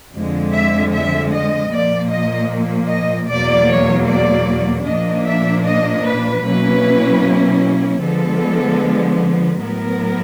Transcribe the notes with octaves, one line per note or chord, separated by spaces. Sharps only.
F2 D3 F3 G#3
E5
E5
D#5
A#2 F3 A#3 D5
D#5
D#5
E2 B2 F#3 A#3 D5
C#5
D5
A#2 F3 A#3 D4 D#5
E5
D#5
B4
B2 F#3 A#3 C#4 E4 B4
D3 F3 G#3 B3 A4
A2 F#3 B3 A#4